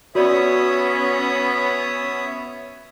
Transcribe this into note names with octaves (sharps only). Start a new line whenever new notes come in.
B3 C#4 F#4 C#5 D5 E5 D#6